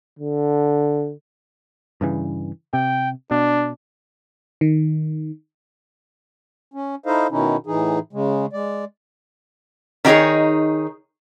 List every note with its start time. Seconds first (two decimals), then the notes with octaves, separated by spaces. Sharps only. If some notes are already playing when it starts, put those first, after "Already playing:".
0.19 D3
2.01 G2 C#3 E3
2.73 C3 G5
3.31 B2 D4
4.61 D#3
6.74 C#4
7.06 D#4 E4 A4 C5 D#5 F5
7.31 B2 D#3 C#4 D#4 E4
7.66 A2 E3 D#4 G#4
8.13 C#3 G#3
8.53 G#3 D5
10.05 D#3 D#4 G4 G#4 C#5